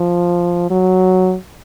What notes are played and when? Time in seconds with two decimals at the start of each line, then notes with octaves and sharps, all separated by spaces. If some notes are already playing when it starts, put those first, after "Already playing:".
Already playing: F3
0.70 F#3